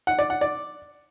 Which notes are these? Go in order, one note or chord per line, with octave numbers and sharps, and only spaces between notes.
F#5
D5
F#5
D5